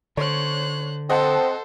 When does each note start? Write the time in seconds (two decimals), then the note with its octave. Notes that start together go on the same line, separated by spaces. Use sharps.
0.17 D3 C5 C#5 F#6
1.10 C4 A4 C5 D#5 F#5 A5